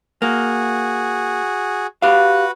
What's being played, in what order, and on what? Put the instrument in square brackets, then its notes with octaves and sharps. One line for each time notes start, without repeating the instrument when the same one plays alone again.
[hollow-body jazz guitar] A#3 [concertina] F#4 G#4
[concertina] F#4 B4 [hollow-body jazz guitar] G4 F5